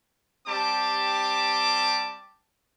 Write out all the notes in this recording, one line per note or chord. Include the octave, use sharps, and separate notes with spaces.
G3 C4 G4 A5 D6